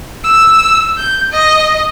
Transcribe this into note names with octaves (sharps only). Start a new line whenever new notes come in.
E6
G6
D#5